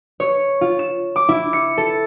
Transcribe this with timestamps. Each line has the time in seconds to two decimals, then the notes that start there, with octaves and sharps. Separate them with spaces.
0.20 C#5
0.61 F4
0.79 E7
1.16 D6
1.29 E4
1.53 C#7
1.78 A4